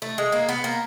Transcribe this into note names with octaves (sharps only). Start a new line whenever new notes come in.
A3
G#3
A#3
B3
A#3